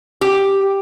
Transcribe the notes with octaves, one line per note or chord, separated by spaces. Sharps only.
G4